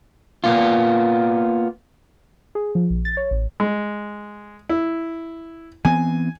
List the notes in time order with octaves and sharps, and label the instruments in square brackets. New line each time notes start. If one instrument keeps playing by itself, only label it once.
[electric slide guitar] A#3 B3 F4
[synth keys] G#4
F3
A#1
A6
C#5
A1
[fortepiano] G#3
E4
[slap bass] E3 B3 C4 [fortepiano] G#5